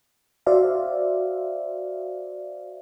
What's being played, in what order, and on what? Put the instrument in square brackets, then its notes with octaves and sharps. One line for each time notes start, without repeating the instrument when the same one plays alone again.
[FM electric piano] F#4 C5 D5 E5 F5